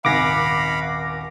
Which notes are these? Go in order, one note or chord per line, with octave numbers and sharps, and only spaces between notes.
D#1 G#1 F5 F#5 G#5 B5 D6 A#6